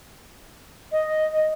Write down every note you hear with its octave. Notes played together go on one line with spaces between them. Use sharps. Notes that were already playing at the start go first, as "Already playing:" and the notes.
D#5